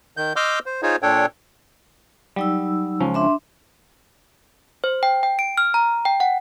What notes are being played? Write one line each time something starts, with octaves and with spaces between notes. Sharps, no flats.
D#3 G6
D#5 C6 D6 E6 F6 G6
C5
D#4 F4 G#4 C5 C#5
A#2 D4 A4 C#5 G5
F#3 G3 D#4 E6
C#2 F3 C#4
D4 E5 C6
C5
G5
G5
D7
F6
A#5
G5
F#5